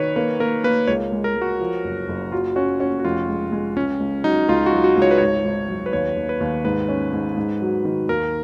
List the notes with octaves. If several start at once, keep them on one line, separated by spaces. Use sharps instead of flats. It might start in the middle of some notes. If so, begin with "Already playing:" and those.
Already playing: D#3 B4 C#5
A#3 B4
A#3 A#4
A#3 B4
C#2 C#5
G#3
A#4
G#3
F#4
F3
F#1
F#1
F#3 F4
C#4 F#4
C#4 F#4
F#4
F1 F4
G#3
G#3
C#2 C#4
C#2
F#3 D#4
C#2 F4
F#4
F#3
F#4
C#2
C#5
B4
G#1 C#5
G#1
F#2
B4
D#2 C#5
D#2
B4
D#2
G#2 B4
C#4
G#2
G#2
F#3
D#3
D#2 A#4